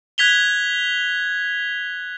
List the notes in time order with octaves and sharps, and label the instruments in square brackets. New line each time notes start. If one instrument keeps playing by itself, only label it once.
[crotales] F#6 G#6 B6 F7 G7